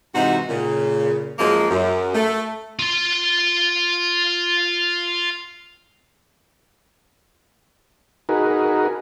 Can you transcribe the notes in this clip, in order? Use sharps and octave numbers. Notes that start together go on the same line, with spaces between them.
G#2 C3 E3 D#4 F#4
A#2 C#3
F#2 F3 G#3 A#3
F#2
A3
F4 C6
D#4 F#4 G#4 A#4 B4